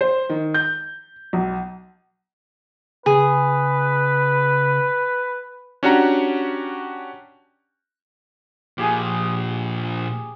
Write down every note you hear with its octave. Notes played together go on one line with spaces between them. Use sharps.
C5
D#3
G6
B1
C#3 G#4 B4
C#4 D4 F#4 G4 F#5 A#5
A#2 F3 G4 G#4 D#6